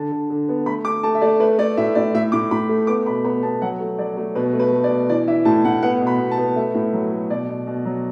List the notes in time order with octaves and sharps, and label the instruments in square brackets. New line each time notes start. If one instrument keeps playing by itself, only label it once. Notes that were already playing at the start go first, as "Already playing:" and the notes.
Already playing: [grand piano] D3 A5
D3
D3
B3
A3 B5
A3 D6
A3 A5
E5
A3 D5
A3 B4
A3 D5
A2 E5
A2 D5
A2 E5
A2 D6
A2 B5
A3
B3 D6
B2 B5
B3 B5
B3 A5
F#3 F#5
A3
F#3 D5
A3
B2 B4
A3
B4
A3
D5
B2
E3 D5
E3 E5
A2 A5
A2 F#5
B3 F#5
B2
B5
B2
A5
B3
A3 E5
A2
F#3
A3
B2 D5
B2
B2
F#3